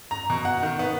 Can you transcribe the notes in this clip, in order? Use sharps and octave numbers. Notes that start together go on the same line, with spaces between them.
A#5
B2
F#5
D#3
B3